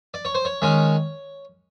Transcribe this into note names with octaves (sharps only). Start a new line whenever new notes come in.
D5
C#5
C5
C#5
D#3 G#3 C#4